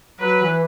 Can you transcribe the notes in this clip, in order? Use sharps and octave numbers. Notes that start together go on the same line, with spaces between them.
F#3 B4
E3